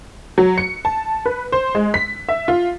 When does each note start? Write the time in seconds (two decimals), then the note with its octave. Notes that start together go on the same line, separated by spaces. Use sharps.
0.38 F#3
0.58 C#7
0.85 A5
1.26 B4
1.52 C5
1.75 G#3
1.94 B6
2.29 E5
2.48 F4